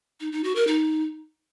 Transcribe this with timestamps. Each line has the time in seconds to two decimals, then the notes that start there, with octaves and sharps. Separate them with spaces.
0.20 D#4
0.32 D#4
0.44 F#4
0.55 A#4
0.67 D#4